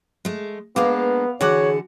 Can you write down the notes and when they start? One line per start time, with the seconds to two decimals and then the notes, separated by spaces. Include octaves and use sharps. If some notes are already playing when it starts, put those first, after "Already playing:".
0.25 G#3 A3
0.76 G#3 A#3 B3 D4 B4 F5 D6
1.41 D3 E3 F#4 G#4 C#5 F#5 D6 F#6